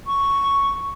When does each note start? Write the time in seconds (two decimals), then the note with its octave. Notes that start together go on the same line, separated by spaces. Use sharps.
0.07 C#6